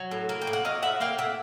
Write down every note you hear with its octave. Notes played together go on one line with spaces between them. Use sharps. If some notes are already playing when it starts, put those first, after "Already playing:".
Already playing: F#3
A2
A#3
G5
A2
F#5
F#3 D#5 F5
A2 E5 F#5
A#3 F5 G5
A2 E5 F#5